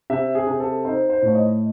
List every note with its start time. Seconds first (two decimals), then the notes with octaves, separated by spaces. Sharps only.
0.10 C3 E5
0.35 G#4
0.47 C3
0.60 A4
0.85 D#4 C5
1.10 C5
1.22 A2
1.28 C#5
1.35 D#5